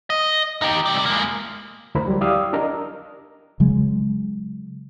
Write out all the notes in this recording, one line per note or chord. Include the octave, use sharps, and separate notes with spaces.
D#5
D#4 G4
C3 G3
G#3 A#3
D2 E4 A#4 C5 B5
F#3 G3
E4 G4 D5 F5 D#6 E6
D4 A#4 D#5
C#3 F#3 G#3